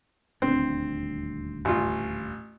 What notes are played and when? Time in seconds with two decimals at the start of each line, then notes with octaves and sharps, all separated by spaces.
0.42 D#1 D2 C4 D4
1.65 A1 F4